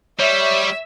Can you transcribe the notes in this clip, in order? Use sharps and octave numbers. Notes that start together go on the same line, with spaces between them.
G3 C#5 E5